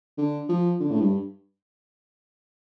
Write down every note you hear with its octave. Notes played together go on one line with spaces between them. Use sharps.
D3
F3
D3
A2
G2